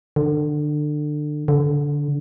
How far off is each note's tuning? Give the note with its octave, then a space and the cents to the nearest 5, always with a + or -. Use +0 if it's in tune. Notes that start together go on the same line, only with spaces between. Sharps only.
D3 +25
D3 -15